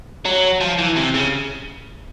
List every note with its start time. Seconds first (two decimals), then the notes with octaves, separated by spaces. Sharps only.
0.25 F#3
0.61 F3
0.78 E3
0.96 C3
1.14 C#3